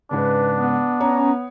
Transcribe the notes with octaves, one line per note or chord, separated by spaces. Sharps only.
G#2 C#3 D4 B4
B3
C#4 C#5 A#5